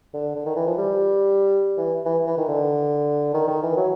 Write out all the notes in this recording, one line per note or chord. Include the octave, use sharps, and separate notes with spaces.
D3
D3
D#3
E3
F3
G3
E3
E3
E3
D#3
D3
D#3
D#3
E3
F#3